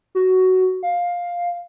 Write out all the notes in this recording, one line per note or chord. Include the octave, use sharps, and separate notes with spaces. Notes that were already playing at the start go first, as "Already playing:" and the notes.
F#4
F5